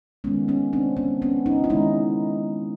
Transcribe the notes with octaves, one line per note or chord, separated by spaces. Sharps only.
D#3 G#3 B3 C#4
B3 C#4
C4 D4
B3 C#4
B3 C#4
C#4 D#4
E4
D#3 G#3 C#4 D#4